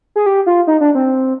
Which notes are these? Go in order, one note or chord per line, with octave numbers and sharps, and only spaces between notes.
G#4
G4
F4
D#4
D4
C4